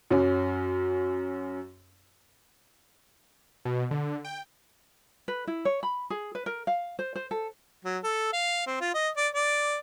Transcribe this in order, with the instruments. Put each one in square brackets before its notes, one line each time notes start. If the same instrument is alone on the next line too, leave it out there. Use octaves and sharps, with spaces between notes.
[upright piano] F#2 C#4
[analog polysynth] B2
D3
G5
[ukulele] B4
E4
C#5
B5
G#4
B4
A#4
F5
C5
C5
A4
[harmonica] F#3
A4
F5
C4
F4
D#5
D5
D5